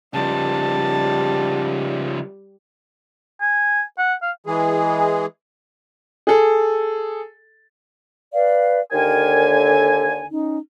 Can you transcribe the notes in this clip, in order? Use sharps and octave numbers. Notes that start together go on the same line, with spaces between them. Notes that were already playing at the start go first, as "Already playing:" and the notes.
C#3 F3 G3 A5
G#5
F#5
F5
E3 G#3 G#4
G#4 A4
B4 D5 F5
D#2 D3 A#4 G5 G#5
A4
C#4 D#4